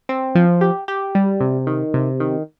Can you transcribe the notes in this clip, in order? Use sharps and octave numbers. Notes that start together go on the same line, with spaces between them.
C4
F3
G4
G4
G3
C3
D#3
C3
D#3